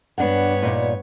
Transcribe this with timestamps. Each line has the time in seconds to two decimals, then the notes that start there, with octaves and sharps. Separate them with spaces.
0.18 G2 B3 D4 C#5 F#5
0.63 A#2 D#4 D5